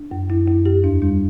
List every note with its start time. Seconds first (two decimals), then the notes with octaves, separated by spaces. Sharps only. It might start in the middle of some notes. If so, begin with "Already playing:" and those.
Already playing: D4
0.11 F#2
0.29 F#2 E4
0.47 F#2 E4
0.66 F#2 G4
0.84 E2 D4
1.02 G3 D4